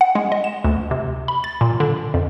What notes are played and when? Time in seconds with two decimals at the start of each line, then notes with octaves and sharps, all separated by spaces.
0.01 F#5
0.15 G#3
0.32 D#5
0.44 E7
0.64 D2
0.91 C3
1.28 B5
1.44 A6
1.61 A#2
1.80 D3
2.14 F2